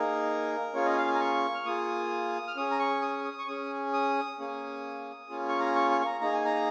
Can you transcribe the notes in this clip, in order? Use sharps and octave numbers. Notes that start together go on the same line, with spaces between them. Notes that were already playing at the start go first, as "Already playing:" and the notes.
Already playing: A#3 D#4 G#4 A#4
A#3 C#4 F4 G#4 C#5
D#5
G#5
F5
G#5
A#5
C#6
F6
A#3 F4 G#4 D#6
F6
C#4 G#4 D#6
A#5
C#6
D#6
D#6
C#6
C#4 G#4 D#6
D#6
A#3 C#4 G#4
A#3 C#4 F4 G#4
C#6
A#5
C#6
C#6
C#6
A#5
A#3 D#4 G#4 A#5
G#5
A#5